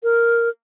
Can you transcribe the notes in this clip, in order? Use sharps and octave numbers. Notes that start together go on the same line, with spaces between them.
A#4